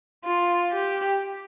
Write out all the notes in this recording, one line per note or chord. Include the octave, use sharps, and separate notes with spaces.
F4
G4